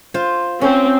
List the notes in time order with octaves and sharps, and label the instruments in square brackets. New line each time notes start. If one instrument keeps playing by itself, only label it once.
[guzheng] F4 C5
[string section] C4 [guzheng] C#4